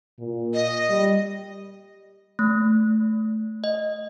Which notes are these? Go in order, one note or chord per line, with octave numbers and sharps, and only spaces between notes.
A#2
D#5
G3
A3
D#5